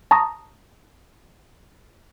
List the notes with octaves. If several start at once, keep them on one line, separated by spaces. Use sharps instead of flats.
A5 A#5 C#6 D#6 A#6